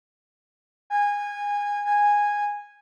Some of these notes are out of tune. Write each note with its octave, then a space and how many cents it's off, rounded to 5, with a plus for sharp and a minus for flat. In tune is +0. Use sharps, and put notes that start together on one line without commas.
G#5 -20
G#5 -10